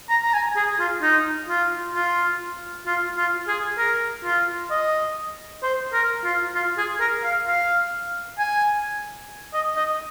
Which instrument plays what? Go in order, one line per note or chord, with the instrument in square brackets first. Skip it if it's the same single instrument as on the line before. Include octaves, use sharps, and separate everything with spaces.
[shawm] A#5
A#5
G#5
G#4
F4
D#4
F4
F4
F4
F4
G#4
A#4
F4
D#5
C5
A#4
F4
F4
G#4
A#4
F5
F5
G#5
D#5
D#5